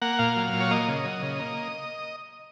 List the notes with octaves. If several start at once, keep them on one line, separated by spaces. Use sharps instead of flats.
A#3 F#5
A#2 F5
F#3
A#2
C#5
A#3 D#5
C#3
F#3
C#3
A#3